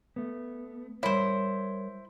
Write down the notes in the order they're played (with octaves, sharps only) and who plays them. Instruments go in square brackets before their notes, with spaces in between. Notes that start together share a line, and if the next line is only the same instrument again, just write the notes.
[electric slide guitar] A3 B3
[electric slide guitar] G3 A#4 C#5 [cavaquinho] E4 C5